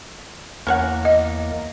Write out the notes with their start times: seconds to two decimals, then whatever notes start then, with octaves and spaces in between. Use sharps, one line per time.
0.67 E2 A#3 C#4 C#5 F#5
1.05 D#5